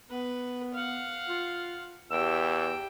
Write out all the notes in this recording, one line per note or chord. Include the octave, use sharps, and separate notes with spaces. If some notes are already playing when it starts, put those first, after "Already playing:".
B3 B4
F5 F#5
F4
E2 G4 G5 E6